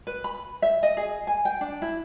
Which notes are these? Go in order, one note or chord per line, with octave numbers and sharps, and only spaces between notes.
B4
B5
E5
D#5
G#4
G#5
G5
D4
E4